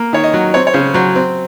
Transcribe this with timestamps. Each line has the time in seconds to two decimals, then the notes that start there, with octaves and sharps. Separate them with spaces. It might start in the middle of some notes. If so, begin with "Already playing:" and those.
Already playing: A#3
0.13 D#3 C#5
0.24 D#5
0.34 F#3
0.54 C4 C#5
0.67 C#5
0.74 C#3 C5
0.94 F#3 C5
1.15 C4